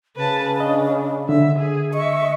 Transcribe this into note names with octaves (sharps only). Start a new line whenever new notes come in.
C#3 B4 A5
D4 D#5
D3 E5
G#4
D#5 E5 C#6